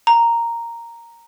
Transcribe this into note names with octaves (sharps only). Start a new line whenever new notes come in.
A#5